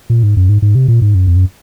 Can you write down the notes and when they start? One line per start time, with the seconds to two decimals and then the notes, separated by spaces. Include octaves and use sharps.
0.10 A#2
0.23 G#2
0.37 F#2
0.49 G#2
0.62 G#2
0.75 C3
0.88 A#2
1.02 G#2
1.15 F#2
1.27 F2
1.36 F#2